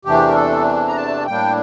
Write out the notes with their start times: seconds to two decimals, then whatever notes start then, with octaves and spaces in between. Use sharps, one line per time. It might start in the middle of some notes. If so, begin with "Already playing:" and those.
0.05 E2 C3 E3 A3 D4 G4
0.28 A#4
0.35 A4
0.88 A#5
0.96 A5
1.27 A2 G3 A#3 D4 G5